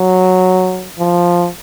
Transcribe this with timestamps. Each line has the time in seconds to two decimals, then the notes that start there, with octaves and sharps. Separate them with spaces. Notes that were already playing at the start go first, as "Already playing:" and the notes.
Already playing: F#3
0.99 F3